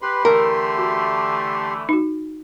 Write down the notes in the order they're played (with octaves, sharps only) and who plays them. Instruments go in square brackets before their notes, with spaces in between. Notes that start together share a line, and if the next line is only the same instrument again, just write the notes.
[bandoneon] G4 C6 [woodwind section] B4
[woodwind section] D3 E3 A3 [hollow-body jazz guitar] A#4
[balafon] F#4
D#4 F#4